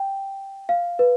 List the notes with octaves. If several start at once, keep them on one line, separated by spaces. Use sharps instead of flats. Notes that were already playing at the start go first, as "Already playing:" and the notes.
Already playing: G5
F5
B4